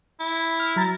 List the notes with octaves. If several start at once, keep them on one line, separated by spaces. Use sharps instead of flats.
E4
F6
F#3 A#5 A6